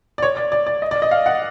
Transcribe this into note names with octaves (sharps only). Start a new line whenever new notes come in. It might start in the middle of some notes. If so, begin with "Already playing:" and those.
D5
C#5
D5
D5
D5
D#5
D5
D#5
F5
F#5